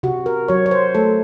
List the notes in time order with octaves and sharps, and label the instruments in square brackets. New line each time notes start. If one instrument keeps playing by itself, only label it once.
[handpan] C3 F#4
A#4
F#3 C#5
C#5
C5
A3 A4